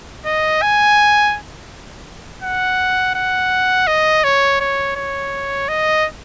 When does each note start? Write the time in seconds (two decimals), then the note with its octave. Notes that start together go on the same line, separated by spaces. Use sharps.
0.25 D#5
0.62 G#5
2.42 F#5
3.15 F#5
3.87 D#5
4.24 C#5
4.60 C#5
4.96 C#5
5.68 D#5